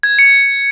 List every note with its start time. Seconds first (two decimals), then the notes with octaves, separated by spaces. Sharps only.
0.03 G#6
0.19 C#7